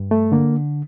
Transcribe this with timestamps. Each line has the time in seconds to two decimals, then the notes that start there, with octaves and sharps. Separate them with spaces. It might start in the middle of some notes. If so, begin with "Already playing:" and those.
Already playing: G2
0.11 A3
0.32 D3 A#3